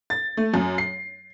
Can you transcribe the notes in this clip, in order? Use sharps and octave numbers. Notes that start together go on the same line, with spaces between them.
A6
A3
F#2
C7